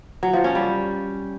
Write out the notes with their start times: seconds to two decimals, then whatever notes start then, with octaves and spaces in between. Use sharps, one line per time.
0.23 F#3
0.33 F3
0.44 C#4
0.55 G3